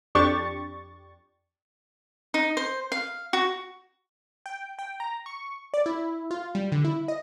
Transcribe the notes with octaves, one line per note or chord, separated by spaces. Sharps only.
F2 D4 G4 C#6 A6
D#4
C5
F5
F#4
G5
G5
A#5
C#6
D5
E4
F4
G3
D3
E4
D#5